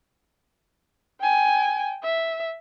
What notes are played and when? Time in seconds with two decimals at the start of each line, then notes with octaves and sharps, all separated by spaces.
1.21 G5 G#5
2.03 E5